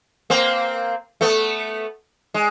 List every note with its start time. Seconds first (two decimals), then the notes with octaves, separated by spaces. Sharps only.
0.30 A#3 C4
1.21 A3 B3
2.34 G#3